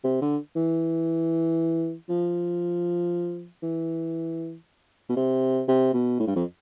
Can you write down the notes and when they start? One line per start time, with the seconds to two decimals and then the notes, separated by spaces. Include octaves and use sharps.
0.04 C3
0.21 D3
0.56 E3
2.09 F3
3.63 E3
5.09 B2
5.16 C3
5.68 C3
5.93 B2
6.19 A2
6.27 G2
6.35 F2